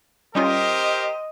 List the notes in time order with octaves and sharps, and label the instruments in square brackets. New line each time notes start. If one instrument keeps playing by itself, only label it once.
[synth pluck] G3 C#4 F4 [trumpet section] G4 A#4 C5 [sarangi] D#5